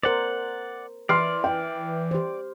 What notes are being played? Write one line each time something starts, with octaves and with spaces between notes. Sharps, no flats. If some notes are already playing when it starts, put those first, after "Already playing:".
A#4 C5 D5 F#5
E3 D5 C6 F6 C7
G5
G4 C5